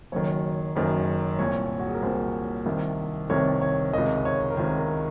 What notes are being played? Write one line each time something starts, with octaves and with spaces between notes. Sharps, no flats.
F#1 F#2 D#3 C#5
F#1 F#2 D#3
C2 A#2 C#5
F#4
G#4
A#4
C2 A#2 C5
C2 C3 D#3
C2 C3 D#3 C#5
C#5
C#2 C3 D#3 D#5
C#5
A#4
C#2 C3 D#3 C5
A#4